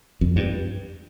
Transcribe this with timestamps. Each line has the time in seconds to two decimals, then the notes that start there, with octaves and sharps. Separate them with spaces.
0.21 F2
0.36 G2